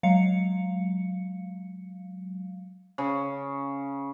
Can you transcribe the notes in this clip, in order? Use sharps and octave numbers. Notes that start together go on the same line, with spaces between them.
F#3 G#3 F5 C#7
C#3